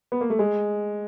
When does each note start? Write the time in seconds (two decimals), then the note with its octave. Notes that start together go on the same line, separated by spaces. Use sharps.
0.12 B3
0.21 A#3
0.30 A3
0.39 G#3